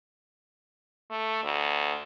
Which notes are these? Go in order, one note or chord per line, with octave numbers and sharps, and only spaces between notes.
A3
D2